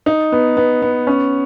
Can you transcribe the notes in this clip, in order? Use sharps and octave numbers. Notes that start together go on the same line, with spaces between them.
D#4
B3
B3
B3
C#4